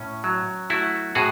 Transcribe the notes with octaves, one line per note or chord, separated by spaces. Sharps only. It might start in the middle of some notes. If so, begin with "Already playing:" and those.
Already playing: A2 C#4
F#3
A3 E4 F#4
A2 F#4 G#4